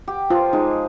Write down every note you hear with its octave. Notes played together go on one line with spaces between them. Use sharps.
G4
F3 F4
G#3 D#4